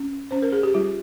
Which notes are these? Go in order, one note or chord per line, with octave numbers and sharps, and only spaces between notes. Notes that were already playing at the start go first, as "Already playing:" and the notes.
Already playing: C#4
C#4 C5
A#4
G#4
G4
G3 F4